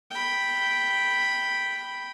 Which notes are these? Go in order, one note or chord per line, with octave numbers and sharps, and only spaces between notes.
G5 B5